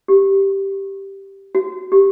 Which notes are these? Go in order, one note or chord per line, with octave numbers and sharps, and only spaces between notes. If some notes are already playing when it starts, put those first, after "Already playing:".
G4
F#4
G4